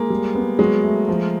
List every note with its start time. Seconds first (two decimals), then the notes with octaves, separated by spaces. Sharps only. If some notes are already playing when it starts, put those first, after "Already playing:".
Already playing: G#3 A#3
0.10 G3
0.35 B3
0.59 F#3 G#3
0.84 A3
1.08 F3